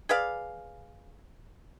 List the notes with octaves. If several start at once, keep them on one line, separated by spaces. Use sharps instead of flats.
G#4 B4 D5 F5